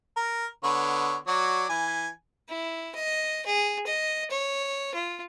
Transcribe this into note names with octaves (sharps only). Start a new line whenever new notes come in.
A#4
D3 B3 C#5
F#3 F#4 D5
E3 G#5
E4
D#5
G#4
D#5
C#5
F4